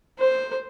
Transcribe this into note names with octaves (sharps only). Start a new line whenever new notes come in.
C5